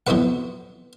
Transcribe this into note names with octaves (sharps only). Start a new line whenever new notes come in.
F2 B3 E4 F#4 B4 F#5